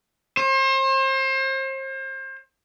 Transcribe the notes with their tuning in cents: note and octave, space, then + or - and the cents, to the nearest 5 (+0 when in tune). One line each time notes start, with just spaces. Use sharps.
C5 +35